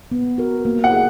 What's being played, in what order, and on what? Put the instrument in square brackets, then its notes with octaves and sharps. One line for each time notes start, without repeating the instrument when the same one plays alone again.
[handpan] B3
F#4 A#4
A#3
[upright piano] F#5
[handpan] G#4